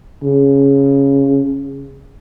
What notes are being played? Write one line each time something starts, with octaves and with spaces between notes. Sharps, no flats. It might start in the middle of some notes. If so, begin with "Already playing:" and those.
C#3